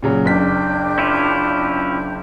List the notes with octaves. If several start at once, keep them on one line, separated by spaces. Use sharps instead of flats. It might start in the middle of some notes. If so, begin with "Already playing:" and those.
A#2 C#3 F#3
F#1 D4 G5 G6 B6
C#4 E4 F4